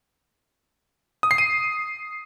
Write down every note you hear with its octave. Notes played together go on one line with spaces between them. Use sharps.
D#6
C7
D#7